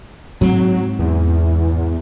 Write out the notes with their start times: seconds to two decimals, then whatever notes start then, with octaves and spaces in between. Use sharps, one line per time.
0.41 G#2 F#3 C4
0.99 E2